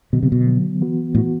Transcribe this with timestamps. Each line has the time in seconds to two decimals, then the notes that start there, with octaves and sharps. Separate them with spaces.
0.13 B2 D3 F#3 B3
0.23 C3
0.32 B2
0.47 D3 F#3 B3
0.81 E3 B3 F#4
1.14 A2 E3 B3 F#4